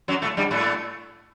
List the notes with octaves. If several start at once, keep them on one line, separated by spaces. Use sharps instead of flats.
F#2 F#3
A2 A3
G2 G3
A2 A3